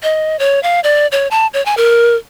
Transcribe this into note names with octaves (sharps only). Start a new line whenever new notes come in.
D#5
C#5
F5
D5
C#5
A5
C#5
G#5
A#4